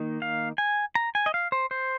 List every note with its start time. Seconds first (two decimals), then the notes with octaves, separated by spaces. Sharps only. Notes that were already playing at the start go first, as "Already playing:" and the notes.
Already playing: D#3 A#3 D#4
0.22 F5
0.58 G#5
0.95 A#5
1.15 G#5
1.26 D#5
1.34 F5
1.52 C5
1.71 C5